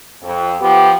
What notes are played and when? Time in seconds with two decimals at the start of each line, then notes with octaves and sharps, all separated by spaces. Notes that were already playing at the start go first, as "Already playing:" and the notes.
0.23 F2
0.60 F3 B3 G4